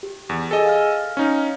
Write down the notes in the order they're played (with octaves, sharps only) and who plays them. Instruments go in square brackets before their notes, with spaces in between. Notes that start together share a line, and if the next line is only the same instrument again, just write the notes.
[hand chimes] G4
[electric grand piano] E2
[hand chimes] G#4 G#5 E6 [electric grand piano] A4 D#5
[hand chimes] F5 F6
[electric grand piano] C#4 D#4